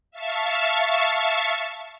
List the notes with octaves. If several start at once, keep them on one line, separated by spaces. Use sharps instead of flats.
E5 F5 A5 C#6